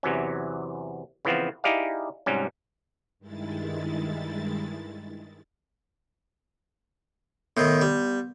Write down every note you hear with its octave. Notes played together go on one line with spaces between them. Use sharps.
E2 C3 E3 F#3 C#4
C#3 E3 F3 B3 C4
D#4 E4 G4 G#4 D5 F5
G#2 C3 F#3 G3 C#4
G2 D#3 G#3 E4 A6
A2 D#3 B3 G6
G3